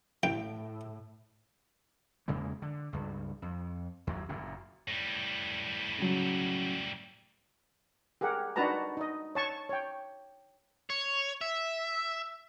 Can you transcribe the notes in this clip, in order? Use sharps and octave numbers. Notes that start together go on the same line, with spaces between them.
A1 A2 G5
E2 C#3 G#3 A#3
D3
C#2 G2
F2
D#2 A2 F#3
F#1 F#2 A#2
A2 G3
C#3 F#3
G4 G#4 A#4 F#5
D4 D#4 F#4 B4 A5 A#5
D#4 D#5
C#5 A5 C#6
C#5 G5
C#5
E5